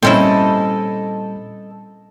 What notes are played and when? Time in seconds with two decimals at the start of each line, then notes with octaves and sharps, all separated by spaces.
0.03 A#2 G3 C4 C#4 E4 A4 D#5